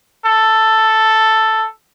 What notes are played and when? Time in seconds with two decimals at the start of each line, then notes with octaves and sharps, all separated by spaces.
0.26 A4